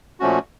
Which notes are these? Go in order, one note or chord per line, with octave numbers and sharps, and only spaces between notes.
A#2 F3 A3 C#4 F#4